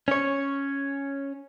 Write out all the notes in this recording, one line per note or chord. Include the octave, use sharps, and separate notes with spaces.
C#4 C#5